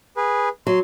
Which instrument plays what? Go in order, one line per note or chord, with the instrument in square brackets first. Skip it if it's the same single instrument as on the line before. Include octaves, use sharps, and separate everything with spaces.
[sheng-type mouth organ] G#4 B4
[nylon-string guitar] F#3 [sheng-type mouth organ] C6